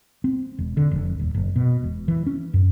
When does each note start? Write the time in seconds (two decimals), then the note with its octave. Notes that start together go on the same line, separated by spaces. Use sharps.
0.24 C4
0.58 E1
0.77 D3
0.91 F1
1.19 D#1
1.35 F#1
1.56 B2
1.84 E1
2.08 E3
2.27 C#4
2.54 F#2